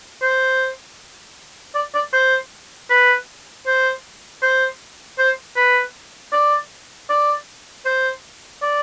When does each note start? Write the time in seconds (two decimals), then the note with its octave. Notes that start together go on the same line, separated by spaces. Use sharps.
0.22 C5
1.75 D5
1.94 D5
2.13 C5
2.90 B4
3.66 C5
4.42 C5
5.18 C5
5.56 B4
6.33 D5
7.10 D5
7.86 C5
8.62 D5